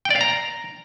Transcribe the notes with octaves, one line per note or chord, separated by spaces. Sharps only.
G5
D5
F5
A#5